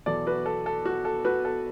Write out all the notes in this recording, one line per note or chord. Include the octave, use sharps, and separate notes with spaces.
E2 B2 F#3 A4 D5
F#4 B4
A4
A4
F#4
A4
F#4 B4
A4